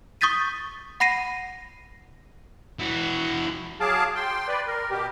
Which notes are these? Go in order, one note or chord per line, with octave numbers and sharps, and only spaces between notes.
C#6 D#6 G6 A6 B6 D#7
F#5 B5 A#6 C7 D#7
E3 F#4
F#3 G#4 F5 A5 D6
G5 C6
B4 D5
A#4
B2 G4